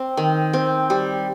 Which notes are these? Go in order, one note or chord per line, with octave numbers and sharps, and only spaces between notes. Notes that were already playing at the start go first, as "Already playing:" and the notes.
Already playing: C4
D#3
C4
G3